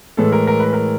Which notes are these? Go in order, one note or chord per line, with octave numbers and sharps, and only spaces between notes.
A2 E3 G#3 A4
A#4
A#4
B4
A#4